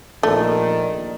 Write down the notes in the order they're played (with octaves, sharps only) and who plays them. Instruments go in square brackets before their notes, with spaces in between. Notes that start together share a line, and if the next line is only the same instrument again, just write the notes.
[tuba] A#1 [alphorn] D#3 [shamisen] A3 [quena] D5